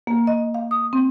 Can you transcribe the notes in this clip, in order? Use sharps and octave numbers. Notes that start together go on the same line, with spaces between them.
A#3
D#5
F5
D#6
C4